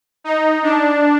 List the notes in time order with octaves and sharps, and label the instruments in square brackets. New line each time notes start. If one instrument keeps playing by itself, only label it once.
[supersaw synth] D#4
D4